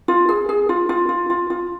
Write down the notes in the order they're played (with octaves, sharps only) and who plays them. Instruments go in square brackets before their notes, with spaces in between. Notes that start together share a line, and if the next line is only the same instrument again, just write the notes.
[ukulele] F4
G#4
G#4
F4
F4
F4
F4
F4